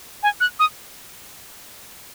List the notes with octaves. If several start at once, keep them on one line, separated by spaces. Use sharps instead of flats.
G#5
F#6
D#6